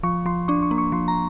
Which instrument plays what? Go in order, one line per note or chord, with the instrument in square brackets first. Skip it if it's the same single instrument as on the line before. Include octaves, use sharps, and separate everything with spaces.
[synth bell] F3 C#6
F3 C6
D4 C#6
C#6
A#3
C#6
F3 C6
A#5